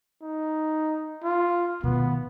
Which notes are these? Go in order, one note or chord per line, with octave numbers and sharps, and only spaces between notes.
D#4
F4
B2 D#3 B3